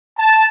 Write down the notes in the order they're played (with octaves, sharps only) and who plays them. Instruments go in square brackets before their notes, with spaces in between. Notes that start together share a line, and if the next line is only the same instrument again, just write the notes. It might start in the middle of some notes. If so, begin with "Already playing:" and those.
[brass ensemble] A5